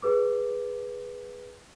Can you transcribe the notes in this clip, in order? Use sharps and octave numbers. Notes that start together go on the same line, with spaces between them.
G#4 B4 D6